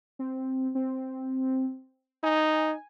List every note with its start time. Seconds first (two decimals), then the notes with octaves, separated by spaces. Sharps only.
0.19 C4
0.75 C4
2.24 D#4 G#5